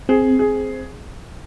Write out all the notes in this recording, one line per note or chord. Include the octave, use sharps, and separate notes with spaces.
C4 G#4
G#4